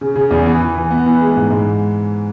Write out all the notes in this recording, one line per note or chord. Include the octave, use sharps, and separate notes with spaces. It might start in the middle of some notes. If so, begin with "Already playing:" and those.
C#3
C#3
E2
E3
E3
E3
B3
E3
G#3
G#2
G#2